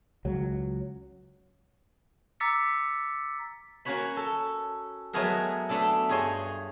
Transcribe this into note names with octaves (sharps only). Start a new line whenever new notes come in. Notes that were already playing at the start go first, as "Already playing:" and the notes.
C#2 F#3
A#5 D6 E6 A6 B6 C#7
A#3 C#4 F#4 C#5 B5
A4
F#3 G#3 A3 B3 G#4 A#4
A3 B3 D4 A4
G2 G#4 C#5 D#5 C6